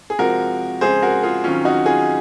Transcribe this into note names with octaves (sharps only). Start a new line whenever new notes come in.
G#4
C3 F3 G#3 F#4 A#4
F2 C#3 G#3 G#4 C5
F#4 A#4
F4 G#4
F2 D#3 F#3 C#4 F4
D#4 F#4
F4 G#4